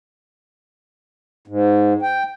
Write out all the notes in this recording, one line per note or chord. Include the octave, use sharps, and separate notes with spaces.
G#2
G5